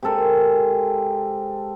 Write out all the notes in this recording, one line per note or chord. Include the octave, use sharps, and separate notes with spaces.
C3 G#3 A4 A#4